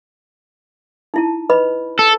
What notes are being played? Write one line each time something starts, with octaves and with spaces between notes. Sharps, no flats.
D#4 E4 A5
B4 D#5 B5
A4